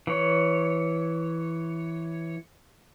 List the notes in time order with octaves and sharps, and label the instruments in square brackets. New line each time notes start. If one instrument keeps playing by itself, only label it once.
[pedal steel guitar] E3 C#5